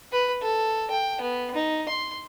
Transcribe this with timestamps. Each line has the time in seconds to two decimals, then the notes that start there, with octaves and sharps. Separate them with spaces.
0.12 B4
0.41 A4
0.91 G5
1.21 B3
1.55 D#4
1.88 C6